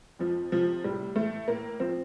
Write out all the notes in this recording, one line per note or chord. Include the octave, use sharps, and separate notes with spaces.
F2 F3
C3 F3
A2 G3
E3 A3
A2 A#3
F3 C4